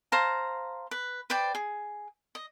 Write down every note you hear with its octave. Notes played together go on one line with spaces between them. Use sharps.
C5 F5 A5 A#5
B4
B4 C5 D5 G5
G#4
D#5